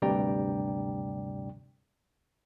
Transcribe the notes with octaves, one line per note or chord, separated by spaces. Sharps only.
D2 G2 C3 D5 G5 A#5